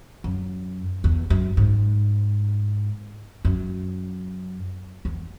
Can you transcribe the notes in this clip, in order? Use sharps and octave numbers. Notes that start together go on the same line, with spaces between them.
F#2
E2
F#2
G#2
F#2
E2